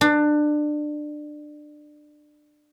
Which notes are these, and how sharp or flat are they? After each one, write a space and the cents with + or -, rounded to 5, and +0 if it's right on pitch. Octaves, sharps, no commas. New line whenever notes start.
D4 +25